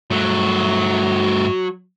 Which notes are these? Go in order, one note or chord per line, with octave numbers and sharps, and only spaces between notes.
G2 F#3 A3